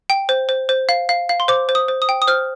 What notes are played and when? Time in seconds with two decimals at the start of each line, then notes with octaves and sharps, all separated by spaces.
0.10 G5
0.29 C5
0.49 C5
0.69 C5
0.89 F5
1.09 F5
1.29 F5
1.40 C6
1.48 C5 D6
1.69 C5
1.75 D#6
1.88 C5
2.02 D#6
2.09 G5
2.22 D#6
2.27 C5 F6